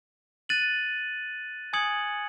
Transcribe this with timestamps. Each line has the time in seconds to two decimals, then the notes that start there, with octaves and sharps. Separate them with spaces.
0.49 F#6 A6 D#7 F#7
1.73 G#5 D#6 G#6 C#7 F#7